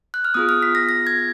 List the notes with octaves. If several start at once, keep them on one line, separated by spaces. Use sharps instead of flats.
F#6
F6
B3 F4 G#4 D#6
F6
B6
A#6
A#6
G#6